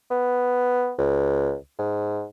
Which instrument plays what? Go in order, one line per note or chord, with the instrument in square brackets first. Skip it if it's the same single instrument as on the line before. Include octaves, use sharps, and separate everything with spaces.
[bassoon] B3
C#2
G#2